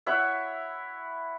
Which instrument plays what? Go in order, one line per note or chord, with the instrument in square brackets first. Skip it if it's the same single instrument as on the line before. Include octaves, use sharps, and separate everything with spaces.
[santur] E4 C#5 E5 F#5